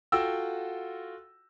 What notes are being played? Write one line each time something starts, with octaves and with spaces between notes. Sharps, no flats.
F4 F#4 A4 F#5 G5 E6